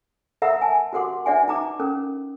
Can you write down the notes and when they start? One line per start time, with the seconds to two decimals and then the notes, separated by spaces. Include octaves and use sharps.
0.42 A#4 E5 F#5 A#5 B5 E6
0.62 G#5 A5
0.93 F#4 G4 A#4 F#5 C6 D6
1.26 D4 B4 D5 E5 F#5 G#5
1.48 D#4 A#5 D6
1.80 C#4 A#4